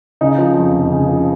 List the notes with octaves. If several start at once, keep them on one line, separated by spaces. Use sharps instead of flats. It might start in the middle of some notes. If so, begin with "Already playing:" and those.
C#3 D#4
F3
F2
F1
C#3
F3